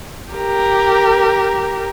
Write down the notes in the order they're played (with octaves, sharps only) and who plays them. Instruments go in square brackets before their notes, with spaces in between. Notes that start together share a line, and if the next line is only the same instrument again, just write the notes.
[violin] G4 A#4